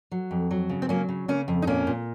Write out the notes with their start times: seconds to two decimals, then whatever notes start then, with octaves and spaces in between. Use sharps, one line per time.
0.11 F#3
0.31 F2
0.51 F#3
0.69 C#3
0.82 C4
0.89 F#3 A#3 C#4
1.09 C#3
1.28 C#3 A#3 C#4
1.48 F2
1.62 D#4
1.67 A#2 A#3 C#4
1.87 A#2